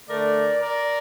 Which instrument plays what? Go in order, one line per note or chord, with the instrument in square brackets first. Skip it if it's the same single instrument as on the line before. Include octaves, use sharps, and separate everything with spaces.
[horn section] D3 A3 A#4 D5
A#4 D5